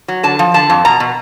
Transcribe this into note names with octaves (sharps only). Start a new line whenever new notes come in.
F#3
D3 A5
F3
D3 A5
F2
B2 A#5
B2